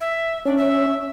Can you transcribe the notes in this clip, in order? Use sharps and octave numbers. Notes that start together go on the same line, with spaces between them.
E5
C#4 D4
E5